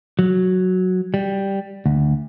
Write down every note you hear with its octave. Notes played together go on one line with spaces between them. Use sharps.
F#3
G3
D2